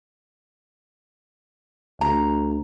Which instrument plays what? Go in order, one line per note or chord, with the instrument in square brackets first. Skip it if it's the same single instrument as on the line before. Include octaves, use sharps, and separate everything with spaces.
[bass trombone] D2 [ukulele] A#5